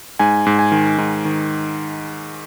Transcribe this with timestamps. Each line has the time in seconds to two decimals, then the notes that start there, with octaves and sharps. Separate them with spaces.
0.19 G#2 G#5
0.46 G#2
0.59 G#5
0.72 D#3
0.98 G#2
1.25 D#3